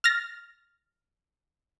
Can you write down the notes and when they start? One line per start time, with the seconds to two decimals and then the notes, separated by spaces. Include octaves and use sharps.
0.04 F6 A6 A#6